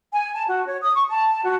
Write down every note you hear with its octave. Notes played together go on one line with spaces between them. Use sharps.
G#5
A5
F#4
C#5
D#6
C#6
A5
F#4